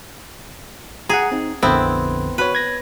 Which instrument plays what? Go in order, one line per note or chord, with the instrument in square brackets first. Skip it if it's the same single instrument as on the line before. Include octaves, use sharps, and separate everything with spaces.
[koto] G#4 [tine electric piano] F#5 A#5
[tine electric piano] C4 D#4
[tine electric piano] A#1 F2 D3 [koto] B3 C4 E4
[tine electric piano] F#4 C#5 [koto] B4
[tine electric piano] G#6 A#6